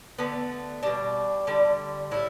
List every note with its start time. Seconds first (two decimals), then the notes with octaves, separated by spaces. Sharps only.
0.19 D3 A3 B3
0.83 B2 G3 D4
1.47 D3 G3
2.11 A2 G3 E4